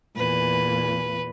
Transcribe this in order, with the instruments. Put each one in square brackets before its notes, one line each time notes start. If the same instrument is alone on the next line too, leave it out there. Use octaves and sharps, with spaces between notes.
[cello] E2 A#2 [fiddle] B4